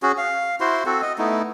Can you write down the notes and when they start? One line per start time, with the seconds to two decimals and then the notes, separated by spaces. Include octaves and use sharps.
0.03 C#4 F#4 G#4
0.18 F5
0.60 E4 F#4 C5 C6
0.86 C4 F#4 A4
1.02 D#5
1.18 A3 B3 D#4 E4